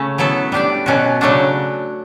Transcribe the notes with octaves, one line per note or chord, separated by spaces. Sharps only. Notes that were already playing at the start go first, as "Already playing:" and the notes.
Already playing: C#3 A3 C#4
F#3 B3 E4 A4
G3 D4 G4 D5
B2 F#3 C#4 F#4
C#3 F#3 A3 D4 F#4